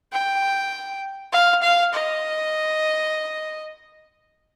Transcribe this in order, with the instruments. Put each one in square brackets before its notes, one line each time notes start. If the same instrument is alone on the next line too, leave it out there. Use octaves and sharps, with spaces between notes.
[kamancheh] G5
F5
F5
D#5